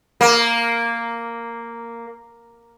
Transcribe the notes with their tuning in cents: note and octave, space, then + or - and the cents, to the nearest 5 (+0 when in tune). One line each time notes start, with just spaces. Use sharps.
A#3 -5